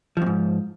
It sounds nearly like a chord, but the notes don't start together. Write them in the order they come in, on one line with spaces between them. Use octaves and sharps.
F3 F2 G#2